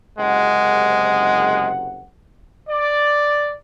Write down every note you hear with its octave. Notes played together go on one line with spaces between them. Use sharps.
F#1 C3 G#3 F#5
D5